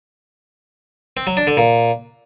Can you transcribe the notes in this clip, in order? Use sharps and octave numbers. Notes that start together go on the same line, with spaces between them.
C4
F#3
D4
D3
A#2